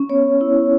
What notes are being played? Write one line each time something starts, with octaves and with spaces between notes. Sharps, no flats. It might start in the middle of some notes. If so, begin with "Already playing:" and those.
Already playing: C#4
B3 C#5
E4